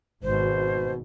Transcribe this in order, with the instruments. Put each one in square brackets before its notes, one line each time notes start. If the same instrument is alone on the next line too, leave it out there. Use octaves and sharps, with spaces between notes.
[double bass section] G#1 [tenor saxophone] B2 [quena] C5